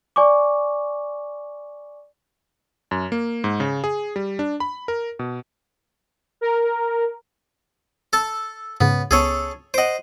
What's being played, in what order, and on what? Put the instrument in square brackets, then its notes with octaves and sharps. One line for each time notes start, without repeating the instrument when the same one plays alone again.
[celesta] D5 G#5 C#6 D6
[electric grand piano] F#2
A#3
G#2
C#3
G#4
G3
D4
B5
A#4
B2
[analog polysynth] A#4
[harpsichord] A4 A5
[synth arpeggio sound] G#2 C#3 [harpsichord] B3
[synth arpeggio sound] C#2 B3 [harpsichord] G#4 A4 C#5
[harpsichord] C5 D#5 [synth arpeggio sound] F#5 D7